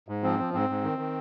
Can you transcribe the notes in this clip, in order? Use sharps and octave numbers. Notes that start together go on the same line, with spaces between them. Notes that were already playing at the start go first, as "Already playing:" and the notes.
G#2
F3 C4
F3
G#2 C4
G#2
D#3
D#3